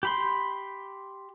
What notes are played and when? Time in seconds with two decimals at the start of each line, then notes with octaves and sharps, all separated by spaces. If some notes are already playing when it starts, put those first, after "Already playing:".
0.03 G4 B5 C6